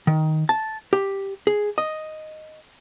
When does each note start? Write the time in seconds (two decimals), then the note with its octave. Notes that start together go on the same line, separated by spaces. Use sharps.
0.07 D#3
0.49 A5
0.93 G4
1.47 G#4
1.78 D#5